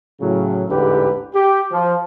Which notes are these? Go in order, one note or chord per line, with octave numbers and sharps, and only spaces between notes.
A2 C#3 F#3
A1 E2 G#2 D3 G4 B4
G4
F3